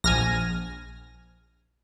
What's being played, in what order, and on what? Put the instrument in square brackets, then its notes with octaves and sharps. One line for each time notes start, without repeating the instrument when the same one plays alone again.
[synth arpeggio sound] A#1 [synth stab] G#5 F6 A#6